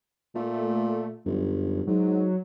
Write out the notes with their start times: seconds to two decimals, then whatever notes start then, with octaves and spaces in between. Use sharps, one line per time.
0.35 A#2 A3
1.26 G1 F#2
1.87 G#2 F#3